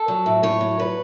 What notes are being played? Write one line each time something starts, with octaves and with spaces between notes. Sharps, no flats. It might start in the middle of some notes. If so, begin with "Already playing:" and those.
Already playing: A4
F#3
A2
A2 C#5
F#3
B4